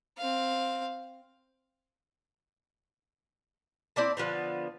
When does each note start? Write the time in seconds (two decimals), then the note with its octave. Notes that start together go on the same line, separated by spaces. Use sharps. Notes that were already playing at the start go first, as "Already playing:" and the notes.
0.18 C4 F5
3.96 C4 E4 D5 A5
4.17 D3 F3 B3 C4